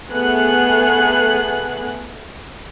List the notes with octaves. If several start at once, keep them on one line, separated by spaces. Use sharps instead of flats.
A3 B3 G#4 F#6